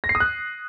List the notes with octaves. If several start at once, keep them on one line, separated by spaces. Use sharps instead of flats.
A#6
C7
D#6
F#6